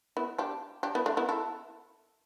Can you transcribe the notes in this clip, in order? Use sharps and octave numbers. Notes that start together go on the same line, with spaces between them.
B3 E4
D4 G4
D4 G4
B3 E4
A3 D4
B3 E4
E4 A4